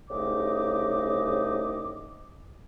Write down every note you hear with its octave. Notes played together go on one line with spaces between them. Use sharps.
C2 C#3 A3 D#4 D#5 D6